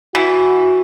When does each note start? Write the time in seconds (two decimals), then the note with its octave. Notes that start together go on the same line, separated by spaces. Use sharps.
0.15 E3 F#4